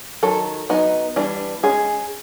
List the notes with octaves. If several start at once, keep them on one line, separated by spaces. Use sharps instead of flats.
D#3 F#3 A4
F#3 B3 D#4
E3 G3 B3 D4
G#3 C#4 G#4